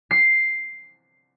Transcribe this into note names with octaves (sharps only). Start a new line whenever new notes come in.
C7